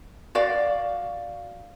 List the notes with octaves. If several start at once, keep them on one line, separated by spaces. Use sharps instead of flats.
F#4 D5 F5